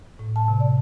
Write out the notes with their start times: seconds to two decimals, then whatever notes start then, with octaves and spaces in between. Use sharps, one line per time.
0.19 A2
0.36 A5
0.48 C3
0.60 D5